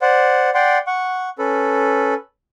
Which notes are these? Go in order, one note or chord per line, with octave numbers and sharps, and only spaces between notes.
C5 D5 F#5
D5 F#5 G5 C6
F#5 C#6
C#4 A4 B4